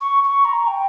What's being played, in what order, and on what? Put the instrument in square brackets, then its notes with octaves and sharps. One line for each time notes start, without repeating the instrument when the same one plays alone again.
[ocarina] C#6
C#6
A#5
G5